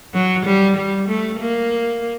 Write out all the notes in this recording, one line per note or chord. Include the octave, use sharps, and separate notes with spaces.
F#3
G3
G3
A3
A#3